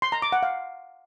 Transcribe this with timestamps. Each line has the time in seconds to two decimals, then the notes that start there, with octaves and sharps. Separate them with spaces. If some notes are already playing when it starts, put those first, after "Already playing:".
0.02 C6
0.12 A#5
0.22 D6
0.32 F#5
0.43 F5